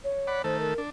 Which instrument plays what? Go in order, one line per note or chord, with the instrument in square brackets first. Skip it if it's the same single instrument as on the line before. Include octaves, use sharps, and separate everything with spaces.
[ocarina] C#5
[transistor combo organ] D5 F#5 B5
[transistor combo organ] D#3 A3 A4 [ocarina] C5
[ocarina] A#4
[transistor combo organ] D4